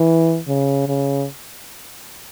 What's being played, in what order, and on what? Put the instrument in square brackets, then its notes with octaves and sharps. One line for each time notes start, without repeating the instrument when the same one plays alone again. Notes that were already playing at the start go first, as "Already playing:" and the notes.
Already playing: [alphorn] E3
C#3
C#3